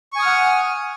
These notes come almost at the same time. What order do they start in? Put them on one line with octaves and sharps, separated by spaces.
C#6 G#5 D#6 F6 F#5